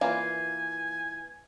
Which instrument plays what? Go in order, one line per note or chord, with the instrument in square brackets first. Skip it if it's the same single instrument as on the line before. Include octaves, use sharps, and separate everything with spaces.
[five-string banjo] E3 A#3 F4 [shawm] G#5